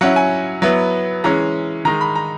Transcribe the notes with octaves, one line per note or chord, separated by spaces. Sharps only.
F#3 C#4 E4 F#5
G#5
F#3 B3 E4
E3 G#3 C#4 A#5
D#3 G#3 D#4 A#5
B5
A#5